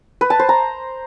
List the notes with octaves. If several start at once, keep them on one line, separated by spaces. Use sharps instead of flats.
B4
A5
C5
A#5